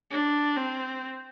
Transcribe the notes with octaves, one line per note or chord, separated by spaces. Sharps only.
D4
C4